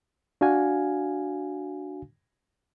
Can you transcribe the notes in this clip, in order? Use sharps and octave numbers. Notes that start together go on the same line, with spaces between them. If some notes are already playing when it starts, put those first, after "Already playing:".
D4 F#4 F5 G#5